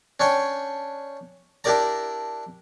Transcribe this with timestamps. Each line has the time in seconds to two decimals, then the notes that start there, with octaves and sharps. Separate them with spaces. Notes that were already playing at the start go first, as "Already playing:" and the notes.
0.20 C#4 D4 C#5 G5
1.64 D4 E4 G4 A#4 D5 A#5